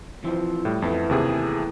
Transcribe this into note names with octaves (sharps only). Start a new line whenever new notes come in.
E3 F3 C4
A2 G3
F2 E3 A3 B3
D#2 C3 G#4